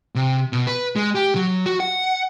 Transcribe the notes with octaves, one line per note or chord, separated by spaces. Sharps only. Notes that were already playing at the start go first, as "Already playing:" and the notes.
C3
B2
B4
G#3
G4
F#3
F#4
F#5